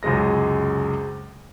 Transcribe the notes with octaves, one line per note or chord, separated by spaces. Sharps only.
C#2 F#2 C3 G#3 A#6